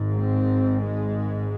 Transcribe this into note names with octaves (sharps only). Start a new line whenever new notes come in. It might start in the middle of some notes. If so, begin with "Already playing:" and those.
Already playing: G#1 G#2
C4
G#3